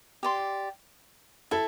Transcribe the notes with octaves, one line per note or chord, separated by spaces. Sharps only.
G4 D5 C6
E4 A4